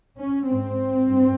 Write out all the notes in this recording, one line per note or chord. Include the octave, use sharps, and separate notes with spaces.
C#4
G#2 C4
G2